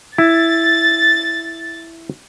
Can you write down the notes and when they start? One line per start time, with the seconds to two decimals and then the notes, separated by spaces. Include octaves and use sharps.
0.18 E4 A6